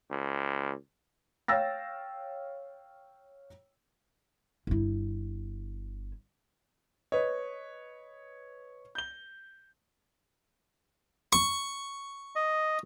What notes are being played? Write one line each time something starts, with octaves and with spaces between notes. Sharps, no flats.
C#2
C#5 F5 G5 E6 A6 A#6
G1 E4
B4 C#5 D#5
G6 G7
C#6
D#5